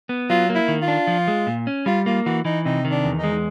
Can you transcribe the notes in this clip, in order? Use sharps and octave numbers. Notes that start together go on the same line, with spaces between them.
B3
F#3 F4
A#3
E4
D#3
F4
D4
F3
G#3
A#2
C#4
G3 F4
A#3 F4
E3 F#4
E3 D#4
C3 D#4
D#3
D4
E2
D#4
G#3